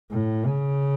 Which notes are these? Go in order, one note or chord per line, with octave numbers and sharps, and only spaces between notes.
A2
C#3